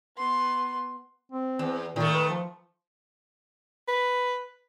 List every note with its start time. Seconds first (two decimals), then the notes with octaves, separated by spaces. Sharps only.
0.17 B3 C6
1.32 C4
1.59 E2
1.96 A#2 D#3 A3
2.14 B4
2.29 F3
3.88 B4